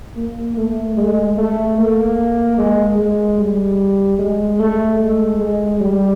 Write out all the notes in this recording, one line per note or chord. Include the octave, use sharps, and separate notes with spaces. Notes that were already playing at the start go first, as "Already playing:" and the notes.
A#3
A3
G#3
A3
A#3
G#3
G#3
G3
G#3
A3
G#3
G#3
G3